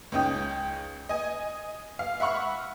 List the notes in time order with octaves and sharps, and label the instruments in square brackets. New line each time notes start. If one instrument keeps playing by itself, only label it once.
[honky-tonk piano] C#2 C#4 D#4 G5 D#6
D#5 G#5
F5
E5 F#5 B5 C#6 F6